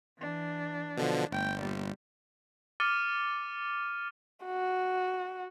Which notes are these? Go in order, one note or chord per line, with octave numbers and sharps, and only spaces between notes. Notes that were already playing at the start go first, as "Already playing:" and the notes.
E3 D4
B2 D3 F3
G1 A3 G5
A#2 G3
D6 F6 A6 C#7 D#7 G7
F#4